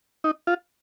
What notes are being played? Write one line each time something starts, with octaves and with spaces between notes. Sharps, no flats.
D#4
F4